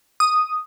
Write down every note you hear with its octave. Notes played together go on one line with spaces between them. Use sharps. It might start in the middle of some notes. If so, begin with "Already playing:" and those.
D#6